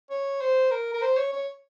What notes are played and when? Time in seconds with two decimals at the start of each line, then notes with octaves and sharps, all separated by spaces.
0.10 C#5
0.41 C5
0.71 A#4
0.94 A#4
1.02 C5
1.17 C#5
1.33 C#5